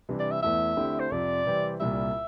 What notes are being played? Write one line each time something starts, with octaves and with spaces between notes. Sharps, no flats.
C3 E3 G3 D4
D5
E5
E2 E3 A3 E4 E5
D3 A3 C4 E4 G4
C5
F2 C3 F3 D5
C3 E3 G3 C4 G4
C2 A#2 G3 E5